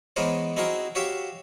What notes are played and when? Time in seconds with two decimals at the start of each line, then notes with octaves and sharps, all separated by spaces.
0.16 E3 G#3 B3 A#4 C5 C#5
0.57 C4 D#4 E4 F#4 G#4 A#4
0.95 F#4 G4 C#5 E5 F5 G5